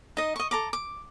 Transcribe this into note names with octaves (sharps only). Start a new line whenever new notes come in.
D#4 D#5
D#5 C#6
A4 A#5 D6
D6